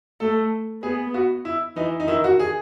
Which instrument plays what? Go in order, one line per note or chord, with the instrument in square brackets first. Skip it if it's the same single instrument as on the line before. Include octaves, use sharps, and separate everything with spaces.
[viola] A3 [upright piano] A4
[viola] B3 [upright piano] G#4
[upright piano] F#4
E4
[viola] E3 [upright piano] D#4
[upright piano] D#4
[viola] D#3 [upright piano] E4
[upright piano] F#4
G#4